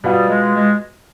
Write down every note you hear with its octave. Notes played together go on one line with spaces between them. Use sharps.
B2 G3 B3 F4
G#3
G#3